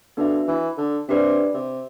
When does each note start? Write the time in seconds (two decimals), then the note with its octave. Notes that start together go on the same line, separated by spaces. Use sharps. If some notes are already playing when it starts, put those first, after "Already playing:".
0.17 D3 B3 D4 F#4 B4 E5
0.48 E3
0.78 D3
1.09 C3 D4 G4 B4 D5
1.54 C3